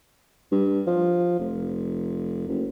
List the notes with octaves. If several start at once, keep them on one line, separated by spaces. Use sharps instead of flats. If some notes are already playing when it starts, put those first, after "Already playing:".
G2
F3
F1
F#1